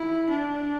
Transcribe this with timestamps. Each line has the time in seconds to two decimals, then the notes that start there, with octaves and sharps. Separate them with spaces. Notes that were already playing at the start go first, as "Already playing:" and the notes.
Already playing: E4
0.29 D4